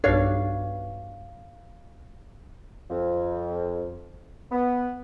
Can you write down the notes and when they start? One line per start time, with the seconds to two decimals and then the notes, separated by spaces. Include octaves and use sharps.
0.04 B1 G2 D4 C#5 F5
2.90 F2
4.52 B3